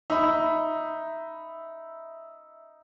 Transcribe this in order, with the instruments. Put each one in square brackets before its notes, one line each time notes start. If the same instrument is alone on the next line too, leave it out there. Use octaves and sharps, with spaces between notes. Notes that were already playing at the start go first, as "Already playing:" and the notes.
[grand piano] D#4 B5 [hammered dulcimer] E5